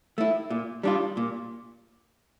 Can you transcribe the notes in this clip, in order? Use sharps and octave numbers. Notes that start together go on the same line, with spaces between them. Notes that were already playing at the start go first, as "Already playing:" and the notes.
A3 E4
A#2
G3 D4 F4
A#2